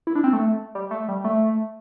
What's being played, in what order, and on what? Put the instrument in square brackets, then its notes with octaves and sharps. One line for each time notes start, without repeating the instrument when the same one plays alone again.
[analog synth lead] E4
D4
C4
A3
G3
A3
G3
A3